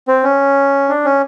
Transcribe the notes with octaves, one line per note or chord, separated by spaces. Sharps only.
C4
C#4
D4
C#4